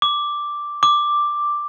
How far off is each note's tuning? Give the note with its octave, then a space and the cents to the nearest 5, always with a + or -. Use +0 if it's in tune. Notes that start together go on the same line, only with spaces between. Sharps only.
D6 +0
D6 +5